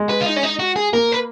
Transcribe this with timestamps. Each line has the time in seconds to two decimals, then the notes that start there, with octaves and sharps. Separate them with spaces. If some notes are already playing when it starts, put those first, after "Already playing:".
Already playing: G#3
0.09 B4
0.21 F4
0.26 D#4
0.36 C#4
0.43 D#4
0.59 F#4
0.76 G#4
0.93 A#3 A#4
1.12 B4